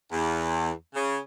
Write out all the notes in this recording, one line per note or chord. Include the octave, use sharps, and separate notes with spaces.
E2
C#3